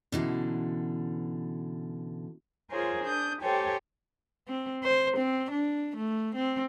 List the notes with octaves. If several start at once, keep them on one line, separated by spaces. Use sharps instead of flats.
B2 D3 E3 C#4 E4 F#4
F4 G#4 A#4 C5 C#5 G#5
D4 D#6 G6
G4 A4 C5 C#5 G5 G#5
C4
C5
C4
D4
A3
C4